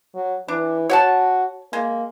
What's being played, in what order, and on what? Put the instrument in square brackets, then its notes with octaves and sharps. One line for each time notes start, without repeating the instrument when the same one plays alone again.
[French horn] F#3
[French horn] E3 [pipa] D4
[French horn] F#4 [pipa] C#5 F#5 A5
[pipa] G#3 [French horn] A#3